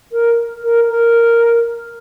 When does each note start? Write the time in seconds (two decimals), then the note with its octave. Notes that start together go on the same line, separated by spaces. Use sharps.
0.11 A#4
0.62 A#4
0.87 A#4